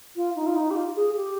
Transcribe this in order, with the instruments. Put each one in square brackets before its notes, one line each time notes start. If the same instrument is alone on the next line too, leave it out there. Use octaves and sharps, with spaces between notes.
[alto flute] F4
D#4
F4
D#4
G4
F4
G#4
G4